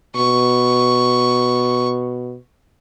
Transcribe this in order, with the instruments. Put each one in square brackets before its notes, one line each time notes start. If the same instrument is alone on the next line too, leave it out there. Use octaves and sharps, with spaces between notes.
[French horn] B2 [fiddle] C#6